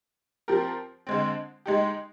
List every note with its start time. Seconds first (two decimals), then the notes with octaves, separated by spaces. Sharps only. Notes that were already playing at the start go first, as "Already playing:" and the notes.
0.48 F3 C4 G4 A#4
1.07 D3 G#3 C4
1.66 G#3 D#4 G4